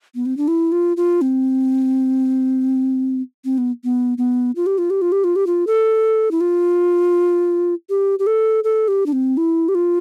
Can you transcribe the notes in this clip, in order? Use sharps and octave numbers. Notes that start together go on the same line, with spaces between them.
B3
C4
D4
E4
F4
F4
C4
C4
B3
B3
B3
F4
G4
F4
G4
F4
G4
F4
G4
F4
A4
E4
F4
G4
G4
A4
A4
G4
D4
C4
E4
G4
F4